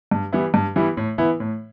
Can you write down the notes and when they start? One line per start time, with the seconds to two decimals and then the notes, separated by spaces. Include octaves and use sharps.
0.11 G2
0.33 E3 G3 B3 E4
0.54 G2
0.76 E3 G3 B3 E4
0.97 A2
1.18 E3 B3 E4
1.40 A2